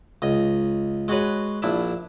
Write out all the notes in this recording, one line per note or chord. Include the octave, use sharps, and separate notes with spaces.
C#2 D#5
G#3 F#4 G#4 B4 C#5
A#1 D4 E4 E5